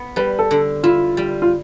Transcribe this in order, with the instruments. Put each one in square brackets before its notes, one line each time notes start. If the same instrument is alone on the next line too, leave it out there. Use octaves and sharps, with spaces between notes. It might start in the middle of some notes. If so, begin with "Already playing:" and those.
Already playing: [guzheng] B3
[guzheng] G3 [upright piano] B4
[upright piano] A4
[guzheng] D3
[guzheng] E4 [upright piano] F4
[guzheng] G3
[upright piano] F4